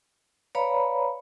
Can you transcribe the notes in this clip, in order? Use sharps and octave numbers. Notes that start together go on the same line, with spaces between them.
B4 C#5 D5 F5 A#5 B5